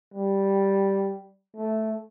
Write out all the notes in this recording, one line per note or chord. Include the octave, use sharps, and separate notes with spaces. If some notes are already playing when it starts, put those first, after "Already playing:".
G3
A3